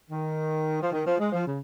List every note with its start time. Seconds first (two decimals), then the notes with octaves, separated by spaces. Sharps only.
0.09 D#3
0.80 F3
0.92 D#3
1.05 F3
1.18 G#3
1.32 F3
1.46 C#3